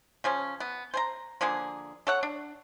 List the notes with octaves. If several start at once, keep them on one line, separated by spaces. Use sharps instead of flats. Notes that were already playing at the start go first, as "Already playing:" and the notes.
C#3 F3 C#4
B3
C5 G#5 A#5
D3 F3 A#3 G#4
A4 C#5 F#5
D4